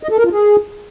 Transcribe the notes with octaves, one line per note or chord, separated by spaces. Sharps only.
D#5
A4
A#4
F4
G#4